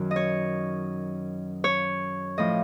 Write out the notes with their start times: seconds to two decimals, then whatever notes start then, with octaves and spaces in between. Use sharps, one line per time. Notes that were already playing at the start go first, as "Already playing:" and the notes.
Already playing: F#2 D#3 F#3
0.11 D#5
0.16 C#5
1.64 C#5
2.38 A2 F3 D#5